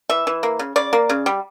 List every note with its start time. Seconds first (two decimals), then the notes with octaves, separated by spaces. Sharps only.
0.09 E3 E5
0.27 E3
0.43 A#3
0.59 C#3
0.76 C#3 D5
0.93 A#3
1.09 C#3
1.26 G3